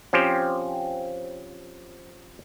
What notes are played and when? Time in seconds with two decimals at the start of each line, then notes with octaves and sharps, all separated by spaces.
0.13 F3 C4 C#4 G4 C5